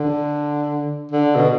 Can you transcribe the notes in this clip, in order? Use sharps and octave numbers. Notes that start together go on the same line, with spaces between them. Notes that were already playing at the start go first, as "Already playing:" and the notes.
Already playing: D3
D3
B2